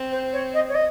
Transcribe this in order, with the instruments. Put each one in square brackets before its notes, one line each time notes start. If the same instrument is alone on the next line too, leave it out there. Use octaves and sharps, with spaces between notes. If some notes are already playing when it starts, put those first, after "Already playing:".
Already playing: [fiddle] C4
[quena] C5
C#5
D#5
C#5
D#5